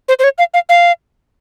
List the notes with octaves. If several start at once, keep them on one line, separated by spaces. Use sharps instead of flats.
C5
C5
C#5
F5
F5
F5